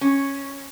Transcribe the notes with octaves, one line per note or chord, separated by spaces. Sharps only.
C#4